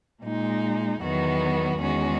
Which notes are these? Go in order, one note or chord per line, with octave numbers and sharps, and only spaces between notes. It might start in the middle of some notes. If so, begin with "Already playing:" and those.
A#2 G#3 D#4
E2 D#3 F#3 B3 F#4
E2 D#3 G#3 C#4 F#4